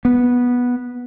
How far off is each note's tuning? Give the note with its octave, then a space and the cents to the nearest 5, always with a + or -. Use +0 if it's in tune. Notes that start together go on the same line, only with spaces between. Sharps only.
B3 -10